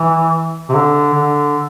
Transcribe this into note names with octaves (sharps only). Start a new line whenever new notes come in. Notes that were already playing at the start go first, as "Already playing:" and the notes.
Already playing: E3
C3
D3
D3